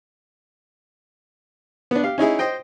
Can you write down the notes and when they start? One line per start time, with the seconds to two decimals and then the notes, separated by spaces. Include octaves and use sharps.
1.91 B3 D4
2.03 G4 F5
2.18 C#4 D#4 E4 G#4
2.39 C5 D#5 G5